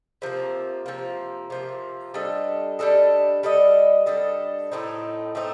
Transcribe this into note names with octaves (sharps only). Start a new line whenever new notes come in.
C3 F3 A#3
C3 F3 A#3
C3 F3 A#3
G3 D4 A4 D#5
G3 D4 A4 D#5
G3 D4 A4 D#5
G3 D4 A4 D#5
A2 A3 C4 D#4
A2 A3 C4 D#4